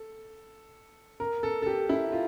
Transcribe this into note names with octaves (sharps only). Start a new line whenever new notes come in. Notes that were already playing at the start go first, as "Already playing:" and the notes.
Already playing: A4
A#4
A4
A4
G4
E4
F4